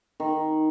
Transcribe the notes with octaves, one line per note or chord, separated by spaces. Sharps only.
D#3